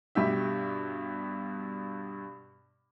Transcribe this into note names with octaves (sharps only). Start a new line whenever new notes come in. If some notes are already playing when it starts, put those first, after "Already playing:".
G2 B2 G4 E5